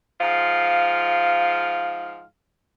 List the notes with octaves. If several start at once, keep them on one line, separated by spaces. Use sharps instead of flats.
G#2 F3 F5